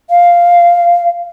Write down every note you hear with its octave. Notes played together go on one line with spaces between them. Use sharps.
F5